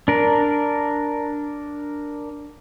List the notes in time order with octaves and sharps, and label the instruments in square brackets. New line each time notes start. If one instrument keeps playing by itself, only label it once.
[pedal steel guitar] D4 A#4